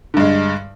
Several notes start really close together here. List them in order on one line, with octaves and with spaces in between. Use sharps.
D3 G2 G#3